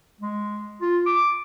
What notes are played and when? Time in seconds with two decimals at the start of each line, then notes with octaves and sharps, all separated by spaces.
0.21 G#3
0.81 F4
1.06 D6